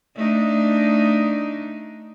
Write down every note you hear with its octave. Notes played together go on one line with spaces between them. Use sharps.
A3 D4 D#4